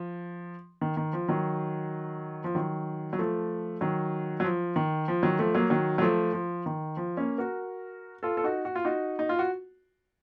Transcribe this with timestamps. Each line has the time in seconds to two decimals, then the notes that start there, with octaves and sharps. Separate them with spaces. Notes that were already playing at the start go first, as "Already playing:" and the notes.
Already playing: F3
0.81 D#3
0.97 D#3
1.13 F3
1.28 D#3 F#3
2.44 F3
2.55 D#3 F#3
3.13 F#3
3.19 F3 A3
3.81 D#3 F#3
4.40 F#3
4.44 F3
4.76 D#3
5.08 F3
5.23 D#3 F#3
5.39 F3 A3
5.55 F#3 A#3
5.70 D#3 F#3
5.98 F#3
6.02 F3 A3
6.33 F3
6.66 D#3
6.97 F3
7.17 A#3 C#4
7.38 F#4 A#4
8.23 F4 A4
8.37 A4
8.44 D#4 F#4
8.65 F#4
8.75 F4
8.85 D#4 F#4
9.19 D#4
9.29 F4
9.39 F#4